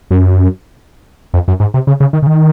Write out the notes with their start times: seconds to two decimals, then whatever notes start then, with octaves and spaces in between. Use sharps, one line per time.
0.11 F#2
1.34 F2
1.48 F#2
1.60 G#2
1.74 C3
1.87 C#3
2.00 C#3
2.13 D#3
2.22 C#3
2.27 D#3